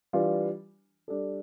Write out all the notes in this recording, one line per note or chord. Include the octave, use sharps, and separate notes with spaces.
E3 G3 D4 F4
G3 D4 A4